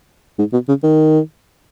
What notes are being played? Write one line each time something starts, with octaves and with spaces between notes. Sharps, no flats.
G#2
B2
C#3
D#3